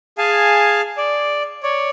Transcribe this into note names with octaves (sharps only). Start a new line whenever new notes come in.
G#4 F5 G#5 A5
D5
C#5 D5